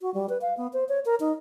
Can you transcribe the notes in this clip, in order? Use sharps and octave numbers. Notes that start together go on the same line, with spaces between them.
F#4
G3
B4
F5
B3
C5
C#5
A#4
D#4